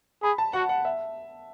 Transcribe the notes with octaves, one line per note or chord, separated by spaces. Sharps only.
G#4 B5
A5
F#4 F#5
F#5
E5